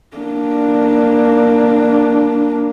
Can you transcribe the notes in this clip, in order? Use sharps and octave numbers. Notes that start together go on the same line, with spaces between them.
A#3 D4